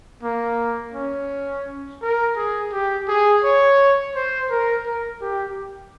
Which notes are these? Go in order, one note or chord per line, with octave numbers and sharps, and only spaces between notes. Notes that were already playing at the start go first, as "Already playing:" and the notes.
A#3
C#4
A#4
G#4
G4
G#4
C#5
C5
A#4
A#4
G4